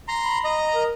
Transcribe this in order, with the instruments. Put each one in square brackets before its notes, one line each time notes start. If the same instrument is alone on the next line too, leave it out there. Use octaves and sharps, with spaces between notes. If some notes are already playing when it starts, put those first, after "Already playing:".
[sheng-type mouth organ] A#5 C6
[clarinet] B5
[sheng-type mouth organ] D#5 A#5
[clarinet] A#4